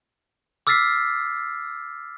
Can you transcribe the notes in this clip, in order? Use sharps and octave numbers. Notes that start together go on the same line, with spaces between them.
D6 E6 F6 A6 B6 C7